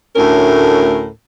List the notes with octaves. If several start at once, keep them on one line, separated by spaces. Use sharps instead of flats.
D2 A2 C#4 A#4